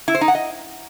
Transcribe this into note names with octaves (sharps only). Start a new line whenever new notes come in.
E4
C5
D#4
F#5
D#5